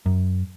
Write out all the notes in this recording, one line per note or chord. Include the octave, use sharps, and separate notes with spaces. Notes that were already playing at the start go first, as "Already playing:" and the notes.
F#2